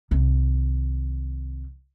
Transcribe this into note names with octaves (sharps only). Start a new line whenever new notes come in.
C2 D#3